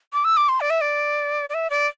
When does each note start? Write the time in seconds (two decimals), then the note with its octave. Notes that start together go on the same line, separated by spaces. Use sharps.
0.13 D6
0.25 E6
0.37 D6
0.49 C6
0.61 D5
0.70 E5
0.81 D5
1.49 D5
1.54 E5
1.70 D5